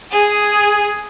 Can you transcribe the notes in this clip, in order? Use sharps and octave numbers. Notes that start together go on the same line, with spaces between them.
G#4